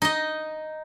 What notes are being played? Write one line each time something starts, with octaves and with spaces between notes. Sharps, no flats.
D#4 D#5